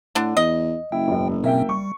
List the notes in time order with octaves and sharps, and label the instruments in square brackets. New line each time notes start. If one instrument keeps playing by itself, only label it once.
[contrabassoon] A2 [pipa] D3 D4
[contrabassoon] E2 [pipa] D#5
[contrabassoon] F#1 [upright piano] E4 [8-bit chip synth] G5
[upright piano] E1 F#2
[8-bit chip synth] B2 C4 C#4 [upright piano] A#3 E5 G5
[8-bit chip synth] G3 [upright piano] C#6